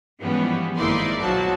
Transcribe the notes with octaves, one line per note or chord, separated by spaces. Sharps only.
G#2 E3 F3 G3 B3 C#4
G#1 A#3 D#4 E4 D5 C6
B1 F3 F#3 F#4 A5